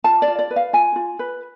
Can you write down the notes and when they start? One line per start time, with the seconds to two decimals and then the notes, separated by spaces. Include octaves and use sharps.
0.04 F4 A5
0.22 D5
0.28 F4
0.39 D5
0.51 B4
0.56 F5
0.73 F4 G#5
0.96 F4
1.19 B4